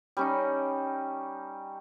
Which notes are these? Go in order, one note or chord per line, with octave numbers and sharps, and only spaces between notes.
G3 C#4 D#4